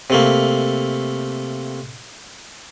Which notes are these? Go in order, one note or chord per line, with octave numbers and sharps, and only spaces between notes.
C3 A3 A#3